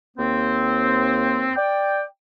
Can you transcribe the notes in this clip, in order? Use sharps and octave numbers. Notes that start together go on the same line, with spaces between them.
D#2 A#3 C4
D5 G5